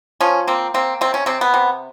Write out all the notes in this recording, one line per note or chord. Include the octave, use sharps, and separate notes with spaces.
F3 C#4
A#3 C4
A#3 C4
C3 C4
C#4
C3 C4
B3
C3